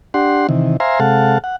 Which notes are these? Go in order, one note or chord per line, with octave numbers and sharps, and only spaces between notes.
D4 G4 F#5 C6
C3 D#3 E3
C5 E5 F5 G#5 A#5 C6
C3 G#3 A4 F5 F#5 A5
F#5